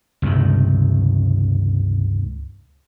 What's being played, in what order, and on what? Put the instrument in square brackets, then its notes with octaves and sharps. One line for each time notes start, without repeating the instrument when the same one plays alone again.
[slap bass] C#2 G2 C3 D#3